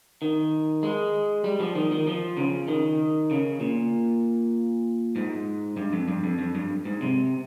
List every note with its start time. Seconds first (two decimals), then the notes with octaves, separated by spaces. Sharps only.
0.22 D#3
0.83 G#3
1.44 G3
1.60 F3
1.75 D#3
1.92 D#3
2.07 F3
2.37 C#3
2.68 D#3
3.31 C#3
3.60 A#2
5.16 G#2
5.77 G2
5.93 F2
6.08 G2
6.24 F2
6.39 F2
6.55 G2
6.85 G#2
7.01 C3